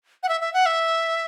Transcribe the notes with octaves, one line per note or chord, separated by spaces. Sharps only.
F#5
E5
E5
F#5
E5